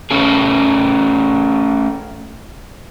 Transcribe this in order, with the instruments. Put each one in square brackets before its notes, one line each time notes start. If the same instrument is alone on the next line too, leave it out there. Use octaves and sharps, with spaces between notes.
[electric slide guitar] A3 C#4 G#4